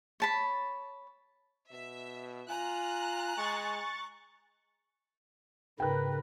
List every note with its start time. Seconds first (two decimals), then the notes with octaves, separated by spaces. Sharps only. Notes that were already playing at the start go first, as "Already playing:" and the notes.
0.20 C#5 A5 B5
1.71 B2 E5
2.49 F4 G#5 A#5 F#6
3.37 G#3 C#6 A6
5.80 G#2 C#3 A#4 B4 G5 F#6